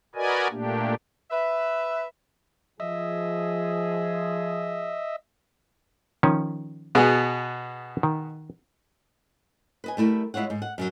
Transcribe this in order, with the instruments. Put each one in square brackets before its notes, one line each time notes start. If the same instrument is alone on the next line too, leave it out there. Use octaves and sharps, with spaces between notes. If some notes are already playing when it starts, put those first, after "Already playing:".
[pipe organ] F#4 A#4 B4 D5 D#5 G#5
A#2 A3 A#3 D4 G4
[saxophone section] B4 E5
[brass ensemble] F3 G#4 [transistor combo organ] D#5 E5
[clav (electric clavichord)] D#3 F3 C#4
[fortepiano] B2 B3 G#4
[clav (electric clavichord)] D#3
[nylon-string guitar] B4 D#5 G#5
G3 A3 E4 A#4
G#3 E4 F4 C#5 F#5
G#2
F#5
F#2 F3 F#3